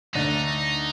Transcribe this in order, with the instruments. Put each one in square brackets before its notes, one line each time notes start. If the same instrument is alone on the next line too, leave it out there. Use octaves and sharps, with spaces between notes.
[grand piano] D2 D3 A3 D4 [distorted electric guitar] D#4